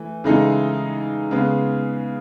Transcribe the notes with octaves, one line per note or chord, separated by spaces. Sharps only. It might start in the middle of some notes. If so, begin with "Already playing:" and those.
Already playing: E3 A3
C#3 E3 G#3 D#4 A4
C#3 G#3 B3